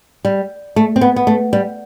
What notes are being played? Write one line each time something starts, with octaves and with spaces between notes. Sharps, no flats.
G3
A3
C4
B3
B3
A3
G3